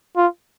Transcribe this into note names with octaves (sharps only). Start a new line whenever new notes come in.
F4